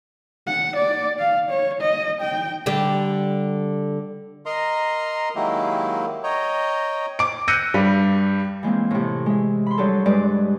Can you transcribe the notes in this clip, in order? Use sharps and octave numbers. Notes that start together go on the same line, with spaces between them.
F#5
D5
F5
C#5
D#5
G5
D3 G3 G4
A#4 D#5 A#5 C6
D#3 F#3 G#3 A#3 E4 G4
C#5 D#5 G5 A#5
D6 D7
E6 F#6 G6 A#6 C#7 D#7
G2 G3
E3 G#3 A#3 C4
A2 C3
G#3 E5
B5 C6
F#3 G3 D4 G#4 A4
G2 G#3 B4 D5